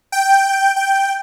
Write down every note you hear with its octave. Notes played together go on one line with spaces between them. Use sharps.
G5
G5